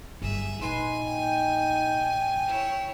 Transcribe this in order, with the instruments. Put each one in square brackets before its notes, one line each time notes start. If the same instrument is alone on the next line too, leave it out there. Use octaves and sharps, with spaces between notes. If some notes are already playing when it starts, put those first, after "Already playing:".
[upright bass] G1 F#3 [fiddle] G#4 E5
[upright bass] A#1 A#2 [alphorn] D#4 [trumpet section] B4 C6 [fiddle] G#5
[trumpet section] G5
[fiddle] E4 C#5